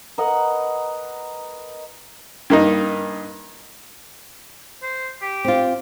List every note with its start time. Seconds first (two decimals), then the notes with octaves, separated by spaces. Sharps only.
0.18 A#4 B4 D#5 F#5
2.50 G2 A#3 D#4
4.83 C5
5.22 G4
5.45 C4 F4